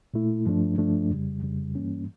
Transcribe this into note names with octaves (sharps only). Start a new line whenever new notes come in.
A#2 A3 E4
G2 F3 A3 D4
G2 F3 A3 D4
F2 C#3 G3
F2 C#3 G3
G2 E3 G3 A#3 C#4